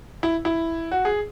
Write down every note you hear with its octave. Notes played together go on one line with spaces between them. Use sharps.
E4
E4
F#4
G#4